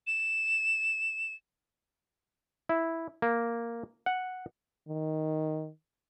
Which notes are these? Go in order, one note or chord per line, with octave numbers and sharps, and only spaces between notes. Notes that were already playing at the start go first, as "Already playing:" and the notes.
E7
E4
A#3
F#5
D#3